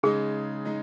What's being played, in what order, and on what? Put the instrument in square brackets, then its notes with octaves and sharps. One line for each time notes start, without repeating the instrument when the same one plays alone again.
[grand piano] C#3 G#3 D#4 [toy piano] G#4
[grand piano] G#3 D#4